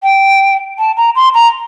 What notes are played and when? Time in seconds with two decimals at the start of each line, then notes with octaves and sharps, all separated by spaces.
0.03 G5
0.79 A5
0.97 A#5
1.16 C6
1.34 A#5